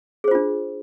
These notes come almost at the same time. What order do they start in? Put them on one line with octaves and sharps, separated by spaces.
G#4 C5 F4 D4